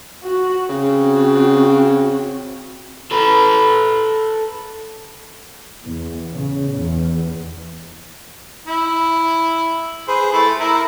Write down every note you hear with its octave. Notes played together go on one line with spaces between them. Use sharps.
F#4
C#3 C4 F#4
A4 B4
E2
C#3
E2
E4
G#4 B4 C5
A3 E4
E4 A#4